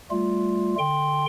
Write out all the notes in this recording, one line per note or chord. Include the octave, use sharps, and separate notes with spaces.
G3 A3 F4
D3 G5 C6